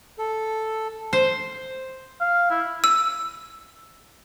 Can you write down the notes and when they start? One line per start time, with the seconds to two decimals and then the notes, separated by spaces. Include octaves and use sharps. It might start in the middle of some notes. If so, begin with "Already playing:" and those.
0.18 A4
1.13 C5
2.20 F5
2.51 E4
2.84 E6